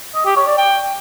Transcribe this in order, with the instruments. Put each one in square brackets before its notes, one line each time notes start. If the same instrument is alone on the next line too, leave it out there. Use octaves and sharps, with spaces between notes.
[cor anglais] D#5
G4
C#5
D5
G5